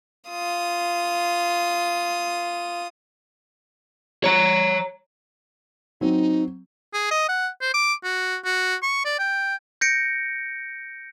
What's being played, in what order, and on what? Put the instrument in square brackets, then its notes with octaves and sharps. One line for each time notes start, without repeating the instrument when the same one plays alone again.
[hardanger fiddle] F4 D#6
[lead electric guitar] C#5 A#5
[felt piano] F#3 C4 [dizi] D#4
[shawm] G#4
D#5
F#5
C5
D6
F#4
F#4
C#6
D5
G5
[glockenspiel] G6 A#6 C#7 D7